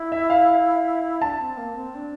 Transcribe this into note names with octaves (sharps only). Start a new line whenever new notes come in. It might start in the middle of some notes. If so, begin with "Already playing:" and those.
Already playing: E4
E5
F5
D4 A5
C4
A#3
C4
D4